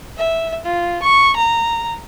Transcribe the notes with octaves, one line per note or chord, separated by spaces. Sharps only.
E5
F4
C#6
A#5